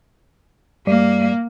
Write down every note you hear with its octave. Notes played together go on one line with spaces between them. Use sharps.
G2 G3 A#3 D5